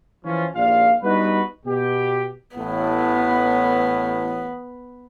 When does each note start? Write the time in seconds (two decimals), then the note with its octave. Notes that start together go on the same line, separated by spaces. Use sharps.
0.25 E3 F3 C#4 F4
0.55 A#1 D#2 F4 D5 F5
1.03 G3 B3 D4 D#4 F#4 B4
1.66 B2 G4
2.56 A1 A2 B3